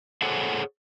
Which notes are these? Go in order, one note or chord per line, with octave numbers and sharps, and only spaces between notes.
G#4 A4 C5 C#5 F#5 G#5